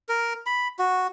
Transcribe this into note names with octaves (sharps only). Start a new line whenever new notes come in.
A#4
B5
F#4